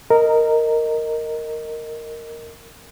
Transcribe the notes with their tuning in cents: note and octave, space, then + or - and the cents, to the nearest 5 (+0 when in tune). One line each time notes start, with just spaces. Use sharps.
A#4 -10 D#5 +0